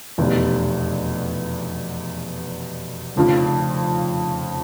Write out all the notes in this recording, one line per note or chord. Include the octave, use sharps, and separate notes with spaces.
F1 E2 B2 G3
F1 F2 C#3 F3